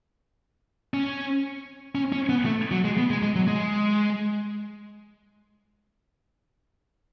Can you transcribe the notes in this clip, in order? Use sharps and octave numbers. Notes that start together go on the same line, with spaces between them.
C#4
C#4
C#4
B3
A3
F#3
G#3
B3
G#3
G#3
F#3
G#3